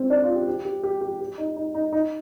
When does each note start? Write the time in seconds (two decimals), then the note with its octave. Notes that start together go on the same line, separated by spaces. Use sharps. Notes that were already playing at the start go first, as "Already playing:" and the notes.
Already playing: C4
0.10 D4
0.23 F4
0.35 G4
0.48 G4
0.65 G4
0.83 G4
1.01 G4
1.21 G4
1.38 D#4
1.56 D#4
1.74 D#4
1.93 D#4